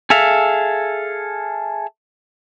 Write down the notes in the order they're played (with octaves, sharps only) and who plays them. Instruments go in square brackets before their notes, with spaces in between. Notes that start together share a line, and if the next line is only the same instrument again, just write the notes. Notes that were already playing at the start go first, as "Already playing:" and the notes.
[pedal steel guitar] G#4 A4 E5 F5